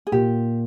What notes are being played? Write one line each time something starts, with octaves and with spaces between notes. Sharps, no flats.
G#4
A#2 G4